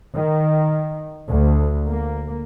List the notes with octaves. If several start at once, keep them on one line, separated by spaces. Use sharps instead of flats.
D#3
D2
A#3